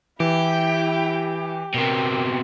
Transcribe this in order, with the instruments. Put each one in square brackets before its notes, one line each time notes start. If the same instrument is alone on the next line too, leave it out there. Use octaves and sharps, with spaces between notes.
[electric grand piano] E3 [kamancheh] E4 G5 [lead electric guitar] G4
[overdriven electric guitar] B2 C4 [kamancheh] A#4